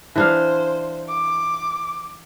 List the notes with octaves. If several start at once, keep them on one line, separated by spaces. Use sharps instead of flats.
E3 D4 C5 F5
D6